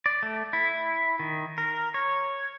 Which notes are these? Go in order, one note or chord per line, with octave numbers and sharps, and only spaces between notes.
D5
A3
E4
D#3
A#4
C#5